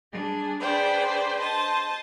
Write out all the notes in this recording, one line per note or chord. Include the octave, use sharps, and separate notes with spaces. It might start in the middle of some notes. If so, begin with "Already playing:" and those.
G3 D4 G#4
D4 G#4 B4 C5 D5 G5
C5 D#5 A5